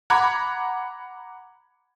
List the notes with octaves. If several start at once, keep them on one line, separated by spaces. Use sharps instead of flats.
F#5 A#5 B5 D6 G#6